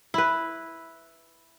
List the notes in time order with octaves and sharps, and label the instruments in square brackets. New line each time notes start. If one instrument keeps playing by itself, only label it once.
[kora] E4 B4